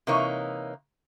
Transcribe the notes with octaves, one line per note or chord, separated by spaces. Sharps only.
C3 E3 A#3 D#4 C#5